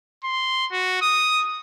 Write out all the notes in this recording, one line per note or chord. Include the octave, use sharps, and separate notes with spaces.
C6
F#4
D#6